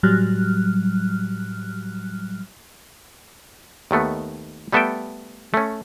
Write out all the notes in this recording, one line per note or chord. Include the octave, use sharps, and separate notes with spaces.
A2 F#3 G3 F6 F#6
D#2 D#3 A3 B3
G3 A3 B3 A4 E5 G5
A3 C#4